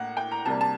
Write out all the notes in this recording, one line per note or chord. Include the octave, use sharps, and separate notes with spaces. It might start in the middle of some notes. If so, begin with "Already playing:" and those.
Already playing: A2 A#3 F#5
G5
A#5
C3 G3 A#3 A5
A5